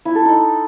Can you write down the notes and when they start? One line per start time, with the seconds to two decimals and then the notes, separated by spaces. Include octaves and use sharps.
0.05 E4
0.15 A4
0.25 D#4